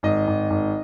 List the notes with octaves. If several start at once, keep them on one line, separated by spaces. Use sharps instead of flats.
G#1 D#5
G#1
G#1